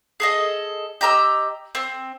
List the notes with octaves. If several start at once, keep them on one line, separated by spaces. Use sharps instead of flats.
G#4 A4 D#5
G4 D#5 A#5 E6
C4